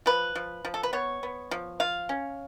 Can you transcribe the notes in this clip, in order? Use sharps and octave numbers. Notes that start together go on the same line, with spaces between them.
F3 B4
F3
F3
A4
B4
B3 C#5
B3
F3
F4 F5
C#4